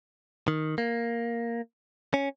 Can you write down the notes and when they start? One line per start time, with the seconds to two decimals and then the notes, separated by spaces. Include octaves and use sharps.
0.48 D#3
0.78 A#3
2.14 C#4